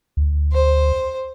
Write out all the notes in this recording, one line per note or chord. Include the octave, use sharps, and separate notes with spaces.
D2
C5